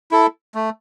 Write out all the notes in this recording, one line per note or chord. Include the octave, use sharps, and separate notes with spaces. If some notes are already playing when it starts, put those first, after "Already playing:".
E4 A4
A3